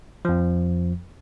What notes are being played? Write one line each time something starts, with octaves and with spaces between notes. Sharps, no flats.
F2 F3